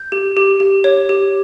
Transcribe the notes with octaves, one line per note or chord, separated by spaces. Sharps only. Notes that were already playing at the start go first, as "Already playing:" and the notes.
Already playing: G6
G4
G4
G4
C#5
G4